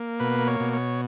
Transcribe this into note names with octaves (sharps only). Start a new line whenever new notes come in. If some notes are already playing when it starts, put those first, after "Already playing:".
Already playing: A#3
B2 B4
C#5
B2
C#5